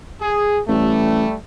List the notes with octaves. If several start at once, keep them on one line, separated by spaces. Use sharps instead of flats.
G#4
A1 G3 A3